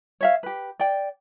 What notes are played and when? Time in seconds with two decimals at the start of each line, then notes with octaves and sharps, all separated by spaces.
0.21 C#5 E5 F5
0.43 G4 B4
0.80 D5 G5